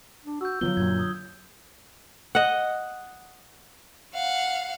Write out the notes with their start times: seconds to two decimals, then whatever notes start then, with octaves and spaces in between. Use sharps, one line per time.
0.25 D4
0.41 F#4 E6 G6
0.61 D3 F3 F#3 B3 F4 G7
0.77 F#2 A#2 G6 G#6
0.99 D#6
2.35 D#5 F#5
4.15 F5 F#5